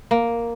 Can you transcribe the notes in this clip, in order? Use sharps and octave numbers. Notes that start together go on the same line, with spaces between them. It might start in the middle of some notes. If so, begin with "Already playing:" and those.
A#3